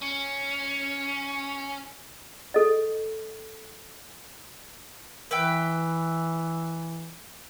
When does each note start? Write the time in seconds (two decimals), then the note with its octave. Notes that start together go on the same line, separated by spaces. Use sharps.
0.02 C#4 C#7
2.54 A4 D#5
5.31 E3 B4 E5 G5